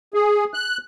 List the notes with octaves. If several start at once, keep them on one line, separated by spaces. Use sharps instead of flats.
G#4
F#6